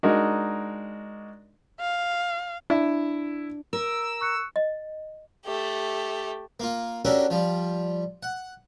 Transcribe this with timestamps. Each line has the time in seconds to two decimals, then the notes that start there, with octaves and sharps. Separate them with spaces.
0.03 G#3 D4 D#4 F#4 A#4
1.80 F5
2.70 D4 E4 E5
3.73 A#4 E6
4.21 C#6 F#6 C#7
4.56 D#5
5.45 A3 G4
6.60 A#3 F4
7.05 C#4 D4 F#4 G4 A4 A#4
7.30 F3 G3
8.23 F#5